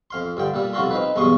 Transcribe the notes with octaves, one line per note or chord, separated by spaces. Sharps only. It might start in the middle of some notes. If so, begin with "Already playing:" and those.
F2 F5 C6
G2 D3 G5
A#2 G3 A4
C2 F2 F4 F#4 A4 C6
C4 D#4 B4
B1 E2 G2 C6 C#6 D#6